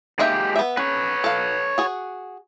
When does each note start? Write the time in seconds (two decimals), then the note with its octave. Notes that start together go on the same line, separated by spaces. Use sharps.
0.19 G#3 A#3 D#4 G4 E5
0.56 B3 E5
0.77 C#4 B4 C#5
1.24 A4 F5
1.78 F#4 G#4